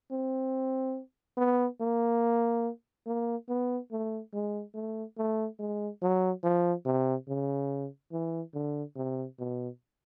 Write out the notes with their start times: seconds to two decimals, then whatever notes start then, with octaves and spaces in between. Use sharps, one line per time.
0.11 C4
1.37 B3
1.81 A#3
3.07 A#3
3.49 B3
3.91 A3
4.33 G#3
4.75 A3
5.18 A3
5.59 G#3
6.02 F#3
6.44 F3
6.85 C3
7.28 C#3
8.12 E3
8.54 D3
8.96 C3
9.39 B2